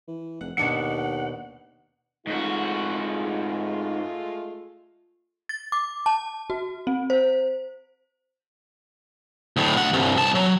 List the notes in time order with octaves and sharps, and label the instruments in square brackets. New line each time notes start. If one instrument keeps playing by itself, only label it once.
[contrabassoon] E3
[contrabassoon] F1 [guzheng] F#5
[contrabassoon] D#2 [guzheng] B2 D4 E5 [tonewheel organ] F#5
[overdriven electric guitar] G#2 F#4 [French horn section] G#3 A3 F4
[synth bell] A6
D6
A5
F#4
C4
C5
[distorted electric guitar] D2 A2
D2 F#5
C2 G2
C2 A5
F#3